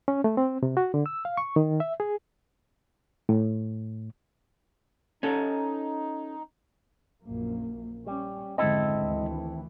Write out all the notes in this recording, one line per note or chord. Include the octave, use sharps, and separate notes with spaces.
C#4
A3
C4
C3
F#4
D3
E6
F5
C#6
D#3
E5
G#4
A2
C#4 D#4 A4
A#1 F#2 A#3
G3 C#4
G#1 F2 D3 G#3 C4 E4 A4 D#5
D2 D#3 E3